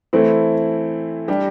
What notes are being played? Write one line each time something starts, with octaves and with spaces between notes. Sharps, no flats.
E3 A3 C4 E4
G3 D4 G4